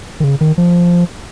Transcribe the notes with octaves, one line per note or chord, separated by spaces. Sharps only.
D#3
C#3
D#3
F3